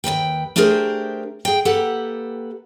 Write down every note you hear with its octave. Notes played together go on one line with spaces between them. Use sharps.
D#2 D#3 B4 G5
A3 D4 G4 G#4 A#4 C5
G#4 G5
A#3 G4 A4 B4 F#5